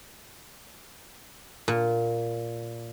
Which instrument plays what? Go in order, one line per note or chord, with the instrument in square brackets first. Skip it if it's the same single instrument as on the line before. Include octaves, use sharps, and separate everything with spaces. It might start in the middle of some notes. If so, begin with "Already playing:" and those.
[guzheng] A#2